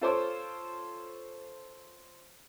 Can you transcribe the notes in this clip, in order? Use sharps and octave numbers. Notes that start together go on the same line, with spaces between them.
F4 A4 C5 C#5 D6